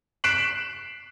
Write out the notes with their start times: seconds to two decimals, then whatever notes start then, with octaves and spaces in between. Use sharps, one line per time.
0.24 F#6 B6 C7 D7 E7 F#7